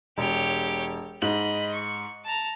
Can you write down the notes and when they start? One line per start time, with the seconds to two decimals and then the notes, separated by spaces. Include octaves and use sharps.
0.18 E1 G4 C#5
1.22 G#2 D#5 B5 F#7
1.74 C#6
2.25 A5 A#5